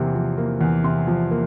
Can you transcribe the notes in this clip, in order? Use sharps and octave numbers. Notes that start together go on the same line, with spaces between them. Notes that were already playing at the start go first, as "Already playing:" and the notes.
Already playing: E2 C3 A#3
F3
A#3
E2
C3 C6
F3
A#3